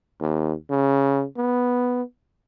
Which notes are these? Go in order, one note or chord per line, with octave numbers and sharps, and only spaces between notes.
D#2
C#3
B3